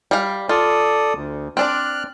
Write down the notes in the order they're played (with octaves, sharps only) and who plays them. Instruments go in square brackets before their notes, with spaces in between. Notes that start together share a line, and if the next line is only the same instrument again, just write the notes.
[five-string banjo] G3 F5
[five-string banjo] F4 [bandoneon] A4 D5 D#6
[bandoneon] D2
[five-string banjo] C4 D4 D5 [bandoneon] F6 F#6